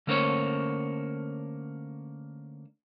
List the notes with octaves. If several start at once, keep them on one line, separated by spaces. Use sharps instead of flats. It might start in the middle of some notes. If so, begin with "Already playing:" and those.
D3 A3 A#3 C#4 C5 C#5